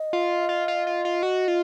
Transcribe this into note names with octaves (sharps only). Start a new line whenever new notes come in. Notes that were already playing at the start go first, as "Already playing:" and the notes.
Already playing: D#5
F4
F4
F4
F4
F4
F#4
F4